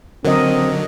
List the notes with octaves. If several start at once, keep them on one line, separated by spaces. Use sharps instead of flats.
D3 F#3 C4 A#4 D#5